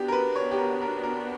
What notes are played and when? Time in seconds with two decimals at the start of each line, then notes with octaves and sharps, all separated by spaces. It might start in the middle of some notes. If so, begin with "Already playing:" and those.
Already playing: B3 D4 F#4 G4
0.08 A#4
0.12 B4
0.36 C#5
0.51 G4
0.58 A#4
0.81 A#4
1.03 A#4